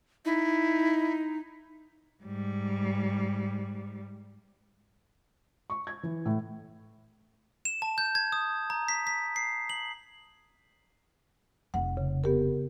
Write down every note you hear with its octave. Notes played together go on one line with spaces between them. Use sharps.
D#4 E4
G#2 G3
C#6
G#6
E3
A2
E7
A5
G6
G#6
D#6
A#5
B6
B6
C7
F#7
F1 A3 F#5
C#3
B3 G4 A#4